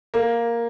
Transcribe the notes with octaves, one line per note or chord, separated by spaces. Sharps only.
A#3